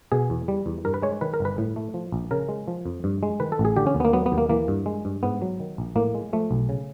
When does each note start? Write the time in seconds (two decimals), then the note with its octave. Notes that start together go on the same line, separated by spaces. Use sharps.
0.12 B2 G#4
0.30 E2
0.48 G3
0.66 E2
0.85 G2 A#4
0.94 B4
1.02 G#3 C#5
1.21 D#3 B4
1.34 A#4
1.40 G1 B4
1.58 A2
1.76 A3
1.94 F3
2.12 A#1
2.31 C#3 A#4
2.49 G#3
2.68 F3
2.86 F2
3.04 G2
3.23 G#3
3.40 D#3 B4
3.52 A4
3.59 A1
3.65 G#4
3.77 D3 G4
3.87 C#4
3.95 D#2
4.00 B3
4.05 A#3
4.13 F#3 B3
4.26 B3
4.32 D#2
4.38 A#3
4.49 E3 A#3
4.68 G2
4.86 G#3
5.05 G2
5.23 G#2 B3
5.42 F#3
5.60 D#3
5.78 A#1
5.96 A2 A#3
6.15 G#3
6.33 F3 A3
6.51 B1
6.69 C#3